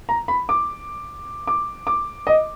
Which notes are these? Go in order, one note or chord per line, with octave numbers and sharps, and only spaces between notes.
A#5
B5
D6
D6
D6
D#5